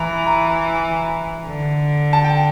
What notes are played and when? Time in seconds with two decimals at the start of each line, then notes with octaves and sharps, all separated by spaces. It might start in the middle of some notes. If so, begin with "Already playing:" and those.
Already playing: E3 A#5
0.27 A#5
1.45 D3
2.13 A5
2.24 G5